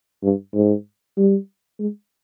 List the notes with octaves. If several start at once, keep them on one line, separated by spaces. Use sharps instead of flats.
G2
G#2
G3
G#3